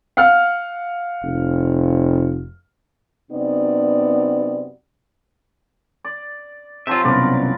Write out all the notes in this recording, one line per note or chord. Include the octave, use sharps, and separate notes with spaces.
F5 F#5 F6
F1
F#2 C3 B3 D#4 F#4 D5
D5
C3 F3 F#3 F4 E5
C2 F#2 B2 A#4 B4 D5